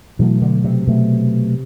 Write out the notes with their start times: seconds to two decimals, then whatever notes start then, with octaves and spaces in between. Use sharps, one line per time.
0.19 B2 E3 F#3 A3
0.42 D3
0.64 C3
0.87 B2 F#3 A3